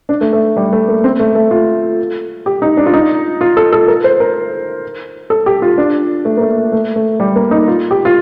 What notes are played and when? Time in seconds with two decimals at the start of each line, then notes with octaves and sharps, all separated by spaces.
0.09 D4
0.21 A3
0.33 A3
0.57 G3
0.73 A3
0.88 A#3
1.04 C4
1.20 A3
1.35 A3
1.51 F4
2.46 G4
2.62 D#4
2.77 D4
2.86 F4
2.93 D#4
3.41 F4
3.57 A4
3.73 A4
3.88 A#4
4.04 C5
4.20 A#4
5.30 A4
5.46 G4
5.62 F4
5.78 D4
6.25 A3
6.37 A#3
6.41 A3
6.72 A3
6.96 A3
7.20 G3
7.36 A#3
7.51 D#4
7.68 F4
7.91 G4
8.05 F4